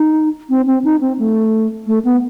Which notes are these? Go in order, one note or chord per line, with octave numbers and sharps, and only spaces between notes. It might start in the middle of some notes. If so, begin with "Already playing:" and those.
Already playing: D#4
C4
C4
D#4
C4
A3
A3
B3